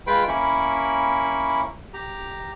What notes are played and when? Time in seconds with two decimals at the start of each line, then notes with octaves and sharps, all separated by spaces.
0.07 G#3 F4 B4 G5 B5 C6
0.28 A#3 C#4 E4 B5 C#6
1.94 G4 A#5